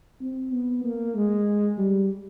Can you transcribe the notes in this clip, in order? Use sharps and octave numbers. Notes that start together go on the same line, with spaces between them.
C4
B3
A#3
G#3
G3